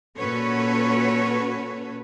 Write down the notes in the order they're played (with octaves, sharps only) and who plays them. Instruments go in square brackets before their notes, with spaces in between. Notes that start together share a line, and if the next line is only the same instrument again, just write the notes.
[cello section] A#2 C#4 F#4 A4 B4 C#5